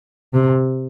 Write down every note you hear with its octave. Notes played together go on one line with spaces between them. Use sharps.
C3